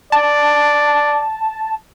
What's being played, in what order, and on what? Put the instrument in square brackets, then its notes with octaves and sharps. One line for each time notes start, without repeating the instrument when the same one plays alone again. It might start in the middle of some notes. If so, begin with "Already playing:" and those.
[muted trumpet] D5 [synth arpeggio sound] A5